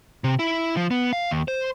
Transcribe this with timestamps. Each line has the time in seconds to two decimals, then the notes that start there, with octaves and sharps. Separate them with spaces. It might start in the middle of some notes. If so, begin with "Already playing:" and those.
0.24 C3
0.39 E4
0.76 F3
0.91 B3
1.13 F5
1.31 D#2
1.48 C5